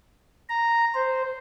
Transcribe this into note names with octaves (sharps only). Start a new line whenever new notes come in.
A#5
C5